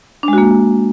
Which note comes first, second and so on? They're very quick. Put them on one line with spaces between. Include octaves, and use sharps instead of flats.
D4 G#3 F#4 A#3